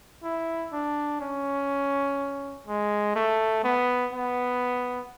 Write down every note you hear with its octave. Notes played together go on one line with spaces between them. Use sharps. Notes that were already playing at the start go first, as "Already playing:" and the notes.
E4
D4
C#4
G#3
A3
B3
B3